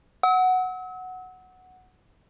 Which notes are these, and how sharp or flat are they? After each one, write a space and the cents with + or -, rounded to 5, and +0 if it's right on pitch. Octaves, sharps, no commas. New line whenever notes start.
F#5 +0 E6 -40